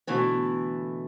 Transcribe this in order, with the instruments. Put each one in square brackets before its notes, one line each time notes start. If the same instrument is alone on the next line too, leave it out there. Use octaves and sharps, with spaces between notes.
[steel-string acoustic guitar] B2 D3 E3 A3